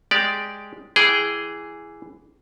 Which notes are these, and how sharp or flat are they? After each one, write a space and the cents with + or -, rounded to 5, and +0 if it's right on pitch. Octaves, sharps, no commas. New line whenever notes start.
G#3 +0 G4 +0 D5 -5
E3 +10 G#4 +0 G5 -15